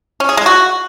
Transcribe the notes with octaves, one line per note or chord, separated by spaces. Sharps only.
C#4
G#4
G#3
F#4